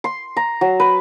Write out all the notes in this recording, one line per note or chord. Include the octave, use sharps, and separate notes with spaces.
C6
A#5
F#3
B4